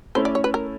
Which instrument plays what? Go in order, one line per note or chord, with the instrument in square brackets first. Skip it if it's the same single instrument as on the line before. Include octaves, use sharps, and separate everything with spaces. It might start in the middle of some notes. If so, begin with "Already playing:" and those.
[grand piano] A3 C#4 E4 [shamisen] C5
[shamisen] D5
C#5
B4
A#4